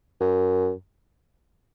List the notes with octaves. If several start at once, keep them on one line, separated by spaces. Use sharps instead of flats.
F#2